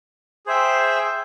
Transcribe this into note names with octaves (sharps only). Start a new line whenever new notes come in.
G#4 C5 E5 G5